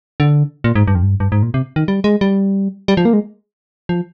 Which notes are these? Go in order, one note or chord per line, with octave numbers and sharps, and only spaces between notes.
D3
A#2
G#2
G2
F2
G2
G2
G#2
A#2
C3
D#3
G3
G#3
G3
G3
F3
A#3
G#3
F3